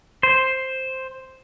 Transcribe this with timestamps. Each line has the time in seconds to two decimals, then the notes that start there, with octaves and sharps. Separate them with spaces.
0.23 C5